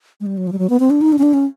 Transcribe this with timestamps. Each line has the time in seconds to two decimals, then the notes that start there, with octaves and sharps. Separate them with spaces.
0.20 G#3
0.26 G3
0.37 F#3
0.47 F3
0.52 G3
0.59 F#3
0.70 B3
0.80 C4
0.90 D4
1.01 D#4
1.13 D4
1.18 C#4
1.23 D4
1.34 C#4